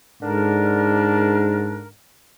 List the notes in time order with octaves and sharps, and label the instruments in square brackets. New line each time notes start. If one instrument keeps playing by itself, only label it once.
[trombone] G#2 [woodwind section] D3 D4 A#4